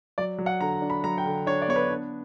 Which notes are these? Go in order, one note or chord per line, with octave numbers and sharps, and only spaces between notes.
F#3 D5
F#3
F#5
D3 A#5
D4
B5
F#3 A#5
G5
D3
D4 C#5
D5
B3 C#5
B4
D4